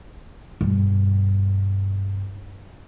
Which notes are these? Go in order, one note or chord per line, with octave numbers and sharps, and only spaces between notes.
G2 B2